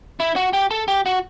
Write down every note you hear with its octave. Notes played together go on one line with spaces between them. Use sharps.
E4
F#4
G4
A4
G4
F#4